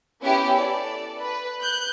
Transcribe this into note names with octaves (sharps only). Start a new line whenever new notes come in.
B3 C#4 E4 G4
A4 D5
B4
F#6 G6